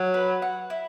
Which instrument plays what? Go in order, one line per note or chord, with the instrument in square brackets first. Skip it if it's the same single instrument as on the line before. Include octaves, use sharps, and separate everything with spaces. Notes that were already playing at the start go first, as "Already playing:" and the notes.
Already playing: [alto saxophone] F#3
[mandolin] B4
F#5
E4